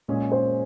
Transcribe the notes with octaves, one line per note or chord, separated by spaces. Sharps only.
A#2 G#3 C#4 G#4
C5